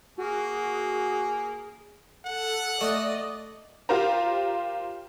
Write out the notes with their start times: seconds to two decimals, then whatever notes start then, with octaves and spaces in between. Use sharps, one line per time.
0.18 A#3 F#4 G#4 G#5
2.26 A4 F#5
2.81 A3 D5 D#5
3.89 F4 G4 A#4 C5 A#5